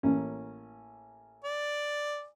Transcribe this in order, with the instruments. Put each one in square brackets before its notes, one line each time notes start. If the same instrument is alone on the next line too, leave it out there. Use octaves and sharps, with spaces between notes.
[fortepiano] A1 A#3 C#4
[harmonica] D5